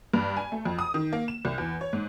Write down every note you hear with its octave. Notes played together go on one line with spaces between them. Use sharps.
G2
G#5
A3
F2
D#6
D#3
A#3
E7
C2
E2
C#5
G#2